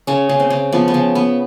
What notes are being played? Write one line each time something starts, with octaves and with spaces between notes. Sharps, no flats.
C#3 C#4
C#3
C4
C#3
F3 B3
B3
C#3
B3